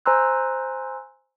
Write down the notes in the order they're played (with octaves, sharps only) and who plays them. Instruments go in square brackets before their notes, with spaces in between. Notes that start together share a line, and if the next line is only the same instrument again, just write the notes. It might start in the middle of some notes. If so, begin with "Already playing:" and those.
[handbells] C5 G#5 A#5 C6 E6 F#6